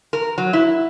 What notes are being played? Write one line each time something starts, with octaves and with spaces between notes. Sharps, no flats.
A#4
F#3
E4